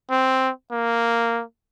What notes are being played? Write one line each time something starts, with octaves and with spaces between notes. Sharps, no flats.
C4
A#3